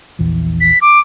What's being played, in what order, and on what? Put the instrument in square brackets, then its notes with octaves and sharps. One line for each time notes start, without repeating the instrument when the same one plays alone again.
[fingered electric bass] A#1 E2 E3
[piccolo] B6
D6